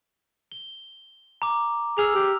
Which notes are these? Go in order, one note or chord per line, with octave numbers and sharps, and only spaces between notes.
G7
A#5 D6
G#4 E6 F6 F7
G4